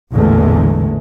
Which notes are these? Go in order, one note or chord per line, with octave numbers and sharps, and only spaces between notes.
A1 E2 A#2 D3 G#3 A3